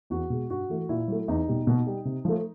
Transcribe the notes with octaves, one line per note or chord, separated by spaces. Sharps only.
E2 F#4
B2 G#3
G2 F#4
E3 A3
A#2 E4
F#3 A3
E2 D#4
B2 G3
B2
G3
C3
F3 A3